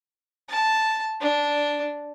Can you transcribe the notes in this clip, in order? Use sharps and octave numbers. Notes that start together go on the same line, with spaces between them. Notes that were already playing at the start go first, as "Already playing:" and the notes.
A5
D4